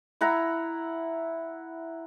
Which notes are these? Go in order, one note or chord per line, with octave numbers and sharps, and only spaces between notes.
E4 F#5 A#5 E6